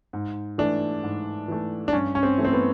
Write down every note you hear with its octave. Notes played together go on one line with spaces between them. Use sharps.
G#2
E3 A3 D4
G#2
E3 A3
D4
G2 C#4
C#4
C4
E3 A3
C4
B3